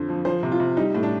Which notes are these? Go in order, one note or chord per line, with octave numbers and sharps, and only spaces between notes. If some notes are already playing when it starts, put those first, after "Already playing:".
Already playing: F2 D3 C5
F3
F3 C5
C3
F4
C3
G3 D#4
A2
D4